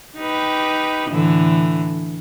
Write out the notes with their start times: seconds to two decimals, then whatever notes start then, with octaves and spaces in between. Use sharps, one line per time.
0.17 D#4 G4 B4
1.10 A2 D3 E3